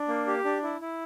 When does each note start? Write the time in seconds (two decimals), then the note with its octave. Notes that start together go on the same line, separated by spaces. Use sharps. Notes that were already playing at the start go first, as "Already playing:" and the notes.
Already playing: D4
0.08 A#3
0.27 G4
0.45 D4
0.63 E4
0.81 E4